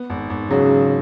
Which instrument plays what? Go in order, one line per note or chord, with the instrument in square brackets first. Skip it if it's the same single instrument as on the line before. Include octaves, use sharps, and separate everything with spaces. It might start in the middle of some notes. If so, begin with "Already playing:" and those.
Already playing: [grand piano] B3
G#1
G#1
[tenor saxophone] C#3 [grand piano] F#3